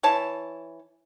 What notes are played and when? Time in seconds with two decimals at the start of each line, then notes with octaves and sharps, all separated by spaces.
0.03 E3 C#5 A5